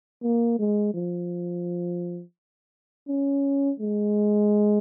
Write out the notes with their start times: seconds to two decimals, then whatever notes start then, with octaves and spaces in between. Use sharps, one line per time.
0.23 A#3
0.59 G#3
0.94 F3
3.08 C#4
3.80 G#3